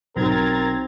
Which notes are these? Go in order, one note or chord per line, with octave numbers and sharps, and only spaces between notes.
B1 C4 A#4 A#5 G#6 A6